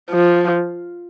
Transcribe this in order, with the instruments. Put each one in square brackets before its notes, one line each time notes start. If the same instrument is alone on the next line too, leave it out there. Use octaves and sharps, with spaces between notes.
[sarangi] F3